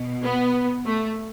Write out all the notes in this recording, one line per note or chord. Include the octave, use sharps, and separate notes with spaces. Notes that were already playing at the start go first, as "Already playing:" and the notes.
Already playing: B2
B3
A3